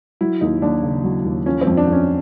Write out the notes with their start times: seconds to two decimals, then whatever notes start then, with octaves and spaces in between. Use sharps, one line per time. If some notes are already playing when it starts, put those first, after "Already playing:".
0.21 F#3 E4
0.41 D#2 D#4
0.62 D#2 D4
0.83 C#3
1.04 F#3
1.25 D#2
1.46 F3 C#4
1.61 C4
1.67 F2
1.77 D4
1.87 F2 C#4